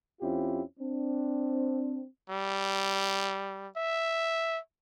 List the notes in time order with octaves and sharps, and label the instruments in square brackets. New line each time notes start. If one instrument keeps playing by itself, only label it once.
[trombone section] F2 C4 C#4 E4 F4 G4
C4 D4
[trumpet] G3
E5